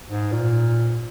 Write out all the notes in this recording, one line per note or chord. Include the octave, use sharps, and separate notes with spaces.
G#2
A#2